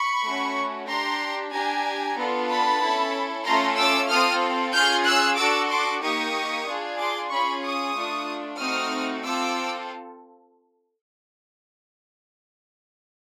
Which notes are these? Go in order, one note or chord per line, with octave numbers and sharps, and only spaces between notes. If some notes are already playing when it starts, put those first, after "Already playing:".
Already playing: B5 C#6
A3 C#4 F#4
D4 G4 A#5 C6
D4 G4 G#5 A#5
B3 D4 F4 A4
A5 B5
C#4 E4 A4
A3 C#4 F4 A4 A#5 C6
D6 E6
C4 F4 A4 D#6 F6
C#4 F4 G#4 F6 G6
E6 F#6
D4 F#4 A4 D6 E6
C6 D6
A#3 D#4 G4 C#6 D#6
D4 F4 G#4
C6 D6
C#4 F4 G#4 B5 C#6
C#6 D#6
A3 D4 F4
A3 C4 D#4 F#4 D#6 F6
C4 F4 A4 D6 E6